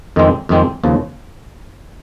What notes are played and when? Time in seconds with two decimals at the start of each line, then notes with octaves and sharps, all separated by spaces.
0.16 F2 D#3 G#3 C4
0.49 F2 D#3 G#3 C4
0.83 D#2 C#3 F3